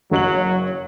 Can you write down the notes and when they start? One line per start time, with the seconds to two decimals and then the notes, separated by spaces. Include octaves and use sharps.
0.11 F#1 F#3 C#5 F#7